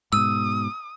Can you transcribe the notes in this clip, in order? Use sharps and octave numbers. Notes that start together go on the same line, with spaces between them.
G#2 B2 D#6 E6